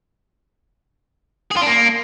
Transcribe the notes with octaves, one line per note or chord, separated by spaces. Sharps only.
G#4
F4
D4
A#3